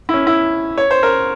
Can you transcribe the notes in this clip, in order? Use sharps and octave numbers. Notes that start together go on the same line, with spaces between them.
E4
C#4
E4
C#5
C5
A#4